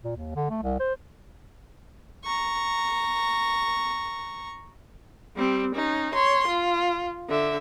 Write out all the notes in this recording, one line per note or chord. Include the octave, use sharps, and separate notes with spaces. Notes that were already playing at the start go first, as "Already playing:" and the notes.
A#2
D#2
D3
A3
C2
C5
A#5 C#6
G3 C4
C#4 D#4
C#5 C6
F4
D3 E5